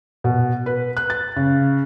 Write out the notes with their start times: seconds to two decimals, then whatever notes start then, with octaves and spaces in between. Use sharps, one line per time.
0.24 B2
0.66 B4
0.97 F#6
1.10 A6
1.36 C#3